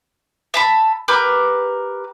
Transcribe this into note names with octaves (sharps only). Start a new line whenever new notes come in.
E5 A5 B5
G4 A#4 B4